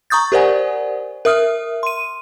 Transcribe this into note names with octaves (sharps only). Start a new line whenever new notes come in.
A#5 C#6 D#6 G6 A6
G4 A#4 C5 D5 F#5 G#5
A#4 E5 D#6 F6
C6 D#7